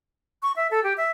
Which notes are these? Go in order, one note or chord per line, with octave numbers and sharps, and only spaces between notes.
C#6
E5
A4
G4
E5